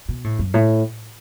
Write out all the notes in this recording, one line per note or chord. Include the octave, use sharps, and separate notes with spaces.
B2
A2
F#2
A2